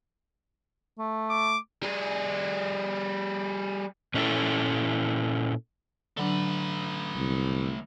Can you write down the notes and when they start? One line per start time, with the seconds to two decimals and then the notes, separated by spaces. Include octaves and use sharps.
0.98 A3
1.30 D6
1.83 G3 G#4
4.14 A#2 C#4 D4 E4 A4
6.17 D3 F#3 A3 D4 B4
7.15 C2